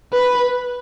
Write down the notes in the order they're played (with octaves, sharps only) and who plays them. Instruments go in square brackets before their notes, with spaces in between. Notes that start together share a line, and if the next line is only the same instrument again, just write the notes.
[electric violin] B4